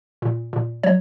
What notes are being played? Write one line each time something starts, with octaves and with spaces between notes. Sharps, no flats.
A#2
A#2
F#3 C#5